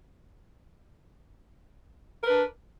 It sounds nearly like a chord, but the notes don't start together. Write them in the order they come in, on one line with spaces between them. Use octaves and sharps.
A#4 B4 D4